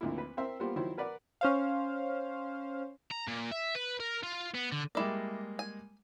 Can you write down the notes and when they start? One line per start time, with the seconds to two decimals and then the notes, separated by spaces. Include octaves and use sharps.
0.01 G#1 D2 F3 A#3 E4
0.18 B4
0.37 C4 A#4 C5 E5
0.60 G3 A#3 B3 F4 G4 C5
0.76 D#3 F3 F#3 E4 C5
0.97 A#4 B4 D5 F#5
1.41 C#4 C5 F5
3.12 A#5
3.28 A#2
3.52 E5
3.75 B4
4.00 A#4
4.23 F4
4.55 B3
4.72 D3
4.95 G3 G#3 A#3 E4 D5
5.59 G#5